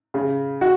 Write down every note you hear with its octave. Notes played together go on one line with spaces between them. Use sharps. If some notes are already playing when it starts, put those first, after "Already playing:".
C#3
F#4